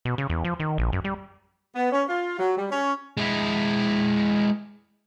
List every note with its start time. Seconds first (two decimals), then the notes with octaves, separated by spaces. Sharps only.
0.05 B2
0.18 C#3
0.30 E2
0.45 F3
0.60 D#3
0.78 A#1
0.93 F#2
1.04 G3
1.76 B3
1.91 C#4
2.08 F4
2.38 F#3
2.57 G3
2.71 C#4
3.17 G#3 E4